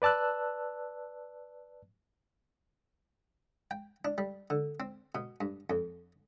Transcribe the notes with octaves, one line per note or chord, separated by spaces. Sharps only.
B4 D5 A5 E6 F#6
G5
D4
G3
D3
C4
B2
G2
F2